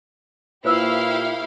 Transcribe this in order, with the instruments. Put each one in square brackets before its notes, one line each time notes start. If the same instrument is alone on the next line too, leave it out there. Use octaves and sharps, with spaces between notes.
[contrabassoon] A#2 [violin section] E4 G4 F5 [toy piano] B4 C5 E6